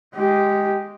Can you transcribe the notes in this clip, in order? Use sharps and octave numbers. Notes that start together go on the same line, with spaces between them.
G#3 G4